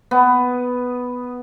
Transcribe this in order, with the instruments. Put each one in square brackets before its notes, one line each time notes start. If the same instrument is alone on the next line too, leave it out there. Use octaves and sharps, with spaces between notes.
[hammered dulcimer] B3